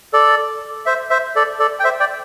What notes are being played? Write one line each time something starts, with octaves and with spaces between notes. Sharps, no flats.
A4 D5
C5 E5
C5 E5
A4 D5
A4 D5
G5
C5 E5
D5 G5